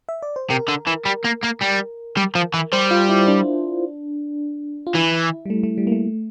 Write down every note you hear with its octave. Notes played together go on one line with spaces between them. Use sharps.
E5
D5
C5
C3 A#4
D3
E3
G3
A#3
A#3
G3
G3
F3
E3
G3 C5
F4
E4
D4
F4
E3 E4
G3
A3
A3
G3
A#3
A3